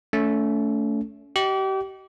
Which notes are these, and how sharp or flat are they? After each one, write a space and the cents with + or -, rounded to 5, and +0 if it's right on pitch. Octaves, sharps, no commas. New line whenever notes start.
A3 +0 C#4 +35
G4 -35 D#5 +0